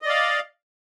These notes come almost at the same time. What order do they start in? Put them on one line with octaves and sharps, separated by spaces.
D#5 D5 F5